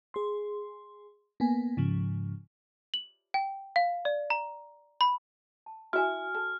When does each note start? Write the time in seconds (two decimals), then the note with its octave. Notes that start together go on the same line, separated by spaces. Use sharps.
0.14 G#4 C6
1.40 A#3 B3 G#5
1.77 G#2 C#3 F3
2.94 F#7
3.34 G5
3.76 F5
4.05 D5
4.30 A#5
5.01 B5
5.66 A5
5.93 E4 F#4 B4 E5 G#5 F6
6.34 A4